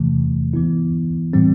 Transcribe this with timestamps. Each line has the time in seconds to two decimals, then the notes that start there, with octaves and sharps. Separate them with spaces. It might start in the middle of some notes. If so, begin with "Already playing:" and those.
Already playing: E2 C3 E3 A3
0.53 E3 B3 E4
1.33 A2 E3 G3 C4